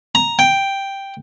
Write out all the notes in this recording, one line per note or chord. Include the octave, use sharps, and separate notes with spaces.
A#5
G5